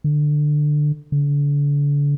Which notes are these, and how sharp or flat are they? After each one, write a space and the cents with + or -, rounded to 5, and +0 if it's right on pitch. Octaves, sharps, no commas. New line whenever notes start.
D3 +15
D3 -35